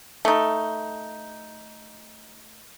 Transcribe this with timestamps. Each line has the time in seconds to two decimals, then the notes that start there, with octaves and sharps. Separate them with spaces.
0.25 A3 D#4